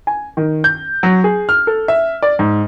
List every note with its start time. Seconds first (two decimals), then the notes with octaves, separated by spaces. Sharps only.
0.07 G#5
0.37 D#3
0.64 G6
1.03 F#3
1.24 G#4
1.49 F6
1.67 A4
1.88 E5
2.22 D5
2.39 G#2